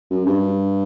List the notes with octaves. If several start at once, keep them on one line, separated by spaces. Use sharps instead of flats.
F#2
G2